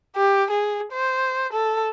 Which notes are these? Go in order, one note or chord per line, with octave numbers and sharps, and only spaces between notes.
G4
G#4
C5
A4